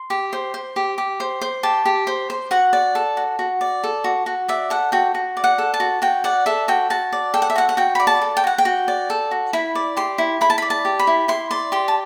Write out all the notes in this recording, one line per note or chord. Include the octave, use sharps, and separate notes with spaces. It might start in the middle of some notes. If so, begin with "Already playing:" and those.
Already playing: C6
G4
C5
C5
G4
G4
C5
C5
G4 A5
G4
C5
C5
F#4 F#5
D5
A4
F#4
F#4
D5
A4
F#4
F#4
D5 E5
A4 F#5
F#4 G5
F#4
D5
F#5
A4
A5
F#4
F#4 G5
D5 F#5
A4 E5
F#4 G5
F#4 A5
D5
A4 G5
F#5
E5
F#4 F#5
F#5
F#4 G5
D5 B5
A5
A4
G5
F#4 F#5
G5
F#4
D5
A4
F#4
E4 B5
D5
G4 C6
E4
E4 B5
A5
D5 B5
A5
G4
B5
E4
E4 C6
D5 C6
G4 C6
A5